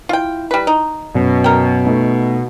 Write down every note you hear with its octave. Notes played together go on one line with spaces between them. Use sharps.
E4 F4 G5
G3 B4
D#4
F#2 B2 B4
A#4 G5
A3 B3 D#4